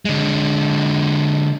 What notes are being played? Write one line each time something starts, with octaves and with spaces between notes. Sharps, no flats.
D3 G#3